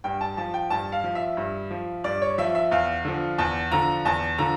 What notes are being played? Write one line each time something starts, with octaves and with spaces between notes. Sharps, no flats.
G2 G5
A5
F3 A5
G5
G2 A5
F5
F3
E5
G2
F3
G2 D5
C#5
F3 E5
E5
E2 F5
D3 F3
E2 A5
D3 F3 A#5
E2 A5
D3 F3 A#5